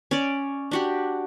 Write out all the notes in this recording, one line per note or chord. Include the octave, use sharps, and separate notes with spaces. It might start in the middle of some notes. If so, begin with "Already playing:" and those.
C#4 D5
D4 F#4 G4